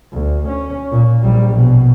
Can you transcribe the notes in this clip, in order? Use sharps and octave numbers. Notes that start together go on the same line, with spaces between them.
D2
C#4
A#2
A#1 G3
B2